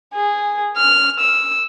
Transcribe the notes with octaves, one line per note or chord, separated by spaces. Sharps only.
G#4
F6
E6